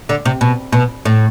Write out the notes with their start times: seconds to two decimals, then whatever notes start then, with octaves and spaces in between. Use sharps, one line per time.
0.09 D3
0.25 C3
0.41 B2
0.72 B2
1.05 A2